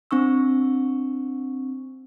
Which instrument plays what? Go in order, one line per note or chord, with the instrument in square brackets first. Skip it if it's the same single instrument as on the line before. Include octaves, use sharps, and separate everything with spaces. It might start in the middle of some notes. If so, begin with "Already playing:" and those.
[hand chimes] C4 D4 C#6 E6